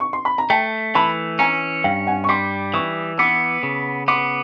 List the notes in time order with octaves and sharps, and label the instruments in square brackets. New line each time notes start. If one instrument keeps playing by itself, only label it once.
[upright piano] C#6
C6
B5
A#5
[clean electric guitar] A3 [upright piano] G5 A5
[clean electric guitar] E3 [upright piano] A5 B5
[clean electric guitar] C#4 [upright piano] G#5 A#5
[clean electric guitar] G2 [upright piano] F5 G5
[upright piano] F#5 G#5
C#6
[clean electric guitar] G3 [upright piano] C6 D6
[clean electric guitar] E3 [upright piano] C#6 D#6
[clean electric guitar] B3 [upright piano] D6 E6
[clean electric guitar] C#3
[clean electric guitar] B3 [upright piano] C6 D6